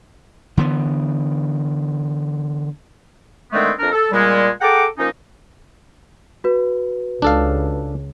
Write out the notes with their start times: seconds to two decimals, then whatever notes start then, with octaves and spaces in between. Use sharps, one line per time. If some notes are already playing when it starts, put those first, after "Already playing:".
0.57 D3 E3 B3
3.52 D3 D#3 G#3 A3 B3 C4
3.79 F2 D4 A#4
3.92 A4
4.12 A#2 G3 G#3
4.61 G#4 A4 F#5 G5 A#5 D6
4.98 F3 A#3 C#4 D#4
6.44 F#4 B4
7.22 C#2 D4 A4 F5